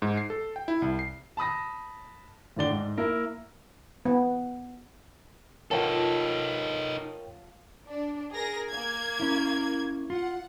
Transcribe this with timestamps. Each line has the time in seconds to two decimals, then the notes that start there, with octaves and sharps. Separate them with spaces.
0.02 G#2
0.17 C7
0.30 A4
0.56 G5
0.68 E4
0.82 C2
0.99 C7
1.37 A5 B5 D#6 A#6
2.56 A2 D3 D5 G7
2.70 G#2
2.97 A#3 E4 A#4
4.05 B3
5.71 D#4 F4 A4 A#4 C#5 G5 A5
7.89 D4
8.33 G#4 A#4 A#6
8.70 A#3 G#6
9.20 C#4 E4
10.10 F4 F#5